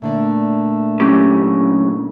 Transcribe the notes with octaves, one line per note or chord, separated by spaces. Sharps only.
A#2 D3 A3 D5
F#2 A2 C#3 G4